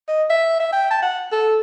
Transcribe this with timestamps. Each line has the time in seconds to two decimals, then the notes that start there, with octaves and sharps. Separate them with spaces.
0.08 D#5
0.30 E5
0.60 E5
0.73 G5
0.91 A5
1.03 F#5
1.32 A4